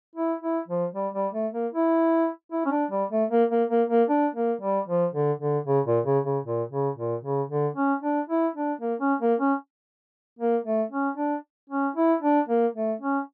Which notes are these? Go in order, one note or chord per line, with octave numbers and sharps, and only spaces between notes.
E4
E4
F3
G3
G3
A3
A#3
E4
E4
C#4
D4
G3
A3
A#3
A#3
A#3
A#3
D4
A#3
G3
F3
D3
D3
C#3
A#2
C#3
C#3
A#2
C#3
A#2
C#3
D3
C#4
D4
E4
D4
A#3
C#4
A#3
C#4
A#3
A3
C#4
D4
C#4
E4
D4
A#3
A3
C#4